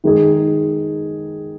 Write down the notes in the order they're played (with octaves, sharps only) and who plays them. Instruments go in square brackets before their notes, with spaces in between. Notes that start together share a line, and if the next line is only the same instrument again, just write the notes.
[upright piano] D#3 G#3 D#4 G#4